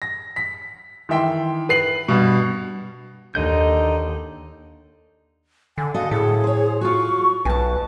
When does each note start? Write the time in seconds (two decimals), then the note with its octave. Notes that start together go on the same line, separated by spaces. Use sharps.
0.02 A#6
0.36 B6
1.09 D#3 E3 E5 G5 C6
1.69 B4 C7 F#7
2.08 G2 B2
3.35 D#2 D3 D#4 D#5 G6
5.78 D3 G#5
5.94 F#4 A4 D#5 F5
6.11 A2 G#4 A4
6.44 C5 C#5
6.81 F4 F#4 C#6
7.45 B1 B4 G#5 A5